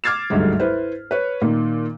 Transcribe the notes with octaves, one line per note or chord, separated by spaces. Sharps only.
D6 F6 G#6 A6 C7 E7
G1 D2 G#2 F#3 G3
E4 B4 C5
B4 C#5
A#2 D#3 A#3